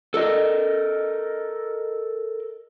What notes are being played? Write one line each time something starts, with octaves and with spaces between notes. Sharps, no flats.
A4 A#4 D#5